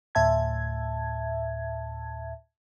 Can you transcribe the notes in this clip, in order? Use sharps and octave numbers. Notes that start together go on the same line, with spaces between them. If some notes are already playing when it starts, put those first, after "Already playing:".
D2 A2 E5 A5 G#6